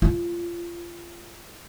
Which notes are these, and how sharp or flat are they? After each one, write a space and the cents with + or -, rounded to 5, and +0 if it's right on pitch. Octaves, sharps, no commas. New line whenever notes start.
F4 -25